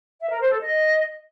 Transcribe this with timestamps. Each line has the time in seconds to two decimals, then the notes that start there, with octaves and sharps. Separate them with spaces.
0.20 E5
0.30 A#4
0.40 C5
0.50 A4
0.60 D#5